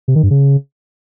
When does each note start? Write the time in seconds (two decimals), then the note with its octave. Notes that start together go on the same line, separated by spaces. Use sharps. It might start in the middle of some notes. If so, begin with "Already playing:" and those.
0.08 C3
0.15 D#3
0.23 G2
0.31 C#3